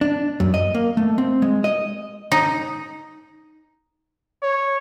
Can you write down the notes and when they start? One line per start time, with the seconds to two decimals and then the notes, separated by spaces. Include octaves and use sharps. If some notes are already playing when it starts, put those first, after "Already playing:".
0.01 D4
0.40 F#2
0.54 D#5
0.74 A#3
0.97 A3
1.18 C4
1.42 G#3
1.64 D#5
2.32 D#4
4.43 C#5